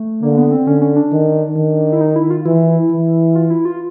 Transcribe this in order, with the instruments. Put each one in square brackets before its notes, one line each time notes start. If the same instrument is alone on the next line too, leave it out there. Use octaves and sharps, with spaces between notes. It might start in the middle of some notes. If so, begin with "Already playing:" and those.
Already playing: [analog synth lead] A3
[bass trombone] D3 [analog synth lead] A#3
[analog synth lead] B3
C4
[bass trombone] D3 [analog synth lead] C#4
[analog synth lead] C#4
D4
[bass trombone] D#3
D#3
[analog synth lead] E4
D#4
E4
F4
[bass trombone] E3 [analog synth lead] E4
[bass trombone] E3
[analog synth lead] F4
E4
F4